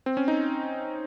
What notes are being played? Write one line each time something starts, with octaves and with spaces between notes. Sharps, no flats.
C4
C#4
D#4